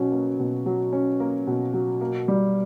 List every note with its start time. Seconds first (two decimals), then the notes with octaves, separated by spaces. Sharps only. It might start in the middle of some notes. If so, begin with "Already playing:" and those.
Already playing: B2 F#3 C#4
0.12 A#3
0.39 B2
0.66 F#3
0.93 C#4
1.20 A#3
1.47 B2
1.74 F#3
2.01 A#3
2.28 G3